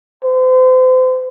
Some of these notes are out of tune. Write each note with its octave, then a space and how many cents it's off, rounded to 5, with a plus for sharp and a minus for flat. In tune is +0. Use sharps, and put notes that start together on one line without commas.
C5 -35